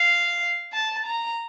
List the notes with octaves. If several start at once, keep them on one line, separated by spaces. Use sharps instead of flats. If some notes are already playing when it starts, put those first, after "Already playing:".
Already playing: F5
A5
A#5